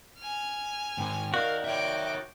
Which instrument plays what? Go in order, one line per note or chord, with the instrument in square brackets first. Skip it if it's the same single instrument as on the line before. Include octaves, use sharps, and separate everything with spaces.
[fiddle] G#5 F6
[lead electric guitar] G#2 D#3 [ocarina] G5
[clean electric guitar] D#3 F#4 [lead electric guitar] A#4 [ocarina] D5 [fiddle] F5
[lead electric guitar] C#5 E5 [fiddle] G5 D6